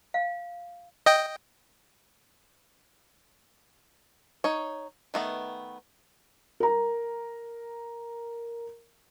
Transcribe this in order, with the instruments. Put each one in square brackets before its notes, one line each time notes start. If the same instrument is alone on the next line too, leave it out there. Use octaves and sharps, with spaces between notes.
[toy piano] F5
[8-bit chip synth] D#5 G5
[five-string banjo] D#4 C#5
D#3 A3 B3
[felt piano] A#4 A#5